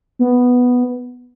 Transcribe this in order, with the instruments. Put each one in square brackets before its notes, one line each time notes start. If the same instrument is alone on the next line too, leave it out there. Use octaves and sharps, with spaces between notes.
[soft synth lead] B3